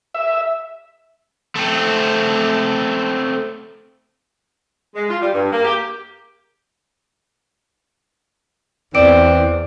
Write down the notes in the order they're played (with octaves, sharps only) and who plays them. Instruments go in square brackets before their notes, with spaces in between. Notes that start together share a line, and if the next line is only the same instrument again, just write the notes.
[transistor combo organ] E5
[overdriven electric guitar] A3 C4
[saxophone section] G#3
F4
G3
G2
A#3
G4
[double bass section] E2 [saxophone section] E3 C4 [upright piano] D5 [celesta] D7